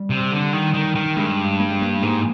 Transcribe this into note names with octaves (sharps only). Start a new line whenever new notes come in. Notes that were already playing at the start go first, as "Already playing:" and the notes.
Already playing: G3
C3
D3
D#3
D#3
D#3
G2 G#3
A#3
G#3
A#3
G#2 A#3